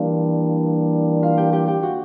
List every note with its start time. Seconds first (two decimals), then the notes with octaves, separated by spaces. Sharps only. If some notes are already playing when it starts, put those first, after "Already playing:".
Already playing: E3 G3 A#3 D4 F4 F5
1.23 F4 F5
1.37 G4 G5
1.52 G4 G5
1.67 G4 G5
1.83 F#4 F#5